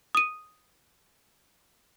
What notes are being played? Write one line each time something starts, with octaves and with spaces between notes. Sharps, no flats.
D#6 D#7